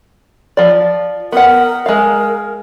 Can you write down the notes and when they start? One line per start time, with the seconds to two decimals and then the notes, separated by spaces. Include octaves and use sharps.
0.57 F3 D5
1.32 B3 A#4 F#5
1.86 G#3 A#4 F5